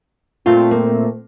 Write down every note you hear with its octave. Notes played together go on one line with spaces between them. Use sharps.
A#2 A3 C4 F4
A#3